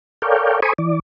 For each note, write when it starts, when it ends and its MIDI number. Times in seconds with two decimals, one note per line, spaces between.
0.22 0.60 69
0.22 0.60 70
0.22 0.60 73
0.22 0.60 74
0.22 0.60 77
0.22 0.60 79
0.62 0.73 69
0.62 0.73 72
0.62 0.73 80
0.62 0.73 83
0.62 0.73 85
0.62 0.73 87
0.78 0.99 52
0.78 0.99 74